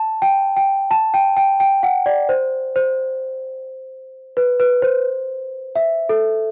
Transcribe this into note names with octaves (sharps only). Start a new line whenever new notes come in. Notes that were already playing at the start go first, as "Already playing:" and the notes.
Already playing: A5
G5
G5
A5
G5
G5
G5
F#5
D5
C5
C5
B4
B4
C5
E5
A4